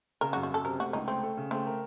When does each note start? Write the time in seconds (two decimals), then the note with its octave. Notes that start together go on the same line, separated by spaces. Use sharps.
0.21 C#3 A#4
0.33 F#4
0.36 F#2
0.43 F#4
0.50 F#2 A4
0.65 C3 A#4
0.80 A3 F#4
0.93 C#2 D#4
1.08 A3 C4
1.23 A4
1.37 C#3
1.51 A3 C4
1.66 A#4